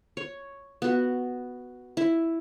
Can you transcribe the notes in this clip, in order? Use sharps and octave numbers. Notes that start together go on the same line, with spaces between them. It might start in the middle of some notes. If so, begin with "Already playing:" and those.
C#5
B3 F#4
E4